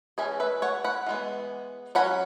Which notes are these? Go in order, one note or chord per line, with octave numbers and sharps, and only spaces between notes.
E3 G#3 C#4 E4 G#4
B4 E5
C#5 F#5
F#5 B5
E3 G#3 B3
F#3 C#4 F#5 B5